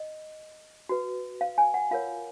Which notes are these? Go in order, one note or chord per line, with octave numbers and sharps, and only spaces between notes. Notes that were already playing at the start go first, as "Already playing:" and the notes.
Already playing: D#5
F#4 B4
F5
G#5
F#5
F4 A#4 C#5 F5